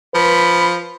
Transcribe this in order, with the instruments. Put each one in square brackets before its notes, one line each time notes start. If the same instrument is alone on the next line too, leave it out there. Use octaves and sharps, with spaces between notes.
[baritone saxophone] F3 [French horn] B4 [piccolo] B5